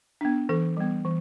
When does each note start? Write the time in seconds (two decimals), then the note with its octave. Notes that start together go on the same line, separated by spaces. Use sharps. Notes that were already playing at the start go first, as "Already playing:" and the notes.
0.21 B3 D4
0.49 E3 A4
0.77 G3 B3
1.05 E3